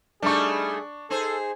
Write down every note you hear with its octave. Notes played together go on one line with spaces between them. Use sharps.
G3 A3 D4 D#4 G#4 C#6
D#4 G#4 A4 C5